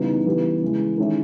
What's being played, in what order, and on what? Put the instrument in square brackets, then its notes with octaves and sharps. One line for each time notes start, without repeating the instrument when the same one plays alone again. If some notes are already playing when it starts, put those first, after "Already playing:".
Already playing: [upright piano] C#3 E3 G3 B3 D#4
C#3 E3 G3 B3 G4
C#3 E3 G#3
D#3 G#3 C#4 E4